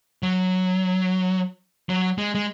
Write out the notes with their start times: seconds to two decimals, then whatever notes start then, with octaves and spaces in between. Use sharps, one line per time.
0.23 F#3
1.89 F#3
2.18 G#3
2.35 G#3